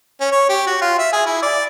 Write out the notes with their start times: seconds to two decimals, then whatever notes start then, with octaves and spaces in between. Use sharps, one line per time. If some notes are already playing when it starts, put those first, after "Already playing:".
0.21 C#4
0.32 C#5
0.49 G4
0.67 F#4
0.82 F4
0.99 E5
1.13 G#4
1.26 E4
1.43 D5